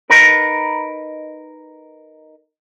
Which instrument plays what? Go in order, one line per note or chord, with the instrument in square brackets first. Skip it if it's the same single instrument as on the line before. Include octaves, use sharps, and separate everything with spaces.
[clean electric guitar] D#4 A#4 B4